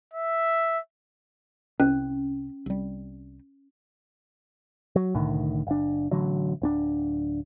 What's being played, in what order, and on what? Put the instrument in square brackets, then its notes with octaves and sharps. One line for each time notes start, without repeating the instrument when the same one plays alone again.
[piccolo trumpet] E5
[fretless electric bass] C2 [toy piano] C#4
[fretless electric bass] C2 G3
[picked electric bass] F#3
C2 A2 D3 D#3
F#1 D4
A1 D3 F#3
D1 C#4 D4